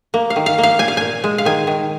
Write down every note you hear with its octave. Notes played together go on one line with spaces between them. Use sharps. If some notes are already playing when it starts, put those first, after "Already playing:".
A#3
F5
D#3
F5
A#3
F5
A#2 G#5
F5
A#2 G#5
G#3
F5
D#3 G#5
D#3